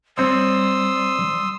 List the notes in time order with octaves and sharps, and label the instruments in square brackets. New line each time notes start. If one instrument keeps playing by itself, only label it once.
[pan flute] G3 [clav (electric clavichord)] C4 C#5 [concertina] C6 D#6 E6